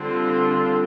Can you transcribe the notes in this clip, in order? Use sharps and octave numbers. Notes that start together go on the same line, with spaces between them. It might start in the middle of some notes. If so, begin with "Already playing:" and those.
Already playing: D3 G3 C4 F4 A4